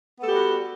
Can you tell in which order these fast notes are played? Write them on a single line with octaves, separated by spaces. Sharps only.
B3 A4 G4 G3 F#4